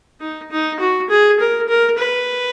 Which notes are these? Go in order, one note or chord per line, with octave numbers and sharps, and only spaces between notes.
D#4
D#4
F#4
G#4
A#4
A#4
B4